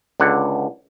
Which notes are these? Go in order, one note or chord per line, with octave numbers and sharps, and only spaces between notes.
C#2 D3 F#5